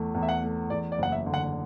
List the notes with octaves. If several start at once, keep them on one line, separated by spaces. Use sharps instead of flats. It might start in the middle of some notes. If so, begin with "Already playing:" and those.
Already playing: E2 E3 A3
E2
E5
F#5
A3
E2 D5
D5
F#1 F#5
E5
D3
F#5